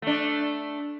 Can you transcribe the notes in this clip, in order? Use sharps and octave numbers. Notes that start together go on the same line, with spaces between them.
A3 D4